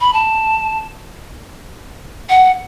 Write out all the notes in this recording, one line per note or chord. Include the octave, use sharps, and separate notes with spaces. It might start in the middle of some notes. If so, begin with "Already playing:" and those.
B5
A5
F#5